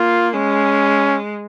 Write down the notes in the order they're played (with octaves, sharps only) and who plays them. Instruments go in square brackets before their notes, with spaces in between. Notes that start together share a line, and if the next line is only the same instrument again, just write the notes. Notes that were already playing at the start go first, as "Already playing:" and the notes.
Already playing: [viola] A#3 [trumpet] F4
[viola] G#3 [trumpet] C#4